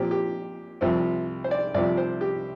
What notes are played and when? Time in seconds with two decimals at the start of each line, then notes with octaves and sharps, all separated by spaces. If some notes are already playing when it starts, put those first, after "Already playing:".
Already playing: A#2 F3 C4 G4
0.11 G4
0.81 C2 C3 F3 C4
1.44 C5
1.51 D5
1.74 C2 C3 F3 D5
1.97 C5
2.21 G4